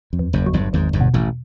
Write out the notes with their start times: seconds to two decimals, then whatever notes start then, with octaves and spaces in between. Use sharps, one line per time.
0.13 F2
0.19 E2
0.33 F#1 F#2
0.46 F#3
0.53 G1 G2
0.73 G#1 E2 G#2
0.93 G1 G2
1.01 B2
1.14 A1 A2